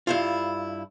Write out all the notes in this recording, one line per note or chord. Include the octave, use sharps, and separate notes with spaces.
G2 E4 F4